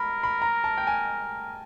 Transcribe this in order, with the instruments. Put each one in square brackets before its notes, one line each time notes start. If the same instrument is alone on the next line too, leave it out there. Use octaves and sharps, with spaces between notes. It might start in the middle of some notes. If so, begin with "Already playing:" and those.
Already playing: [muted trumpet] A#4 [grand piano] B5
[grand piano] B5
A#5
A5
G5
G#5